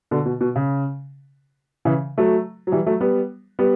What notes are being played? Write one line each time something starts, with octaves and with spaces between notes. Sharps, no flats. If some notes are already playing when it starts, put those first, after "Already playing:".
B2 D3
B2
B2
C#3
C#3 E3
F#3 A3
F#3
E3 G3
F#3 A3
G3 B3
G3 B3